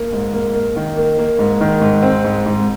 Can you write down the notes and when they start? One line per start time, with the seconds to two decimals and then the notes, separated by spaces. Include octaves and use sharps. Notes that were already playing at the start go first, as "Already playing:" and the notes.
Already playing: A#3
0.13 G#2
0.33 A#3
0.54 A#3
0.76 D#3
0.97 A#3
1.19 A#3
1.39 G#2
1.61 D#3
1.81 G#2
2.03 C4
2.25 G#2
2.46 G#2